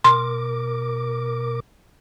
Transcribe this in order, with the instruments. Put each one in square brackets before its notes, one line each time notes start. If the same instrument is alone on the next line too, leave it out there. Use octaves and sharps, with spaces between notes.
[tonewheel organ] B2 A#4 D6 [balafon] C6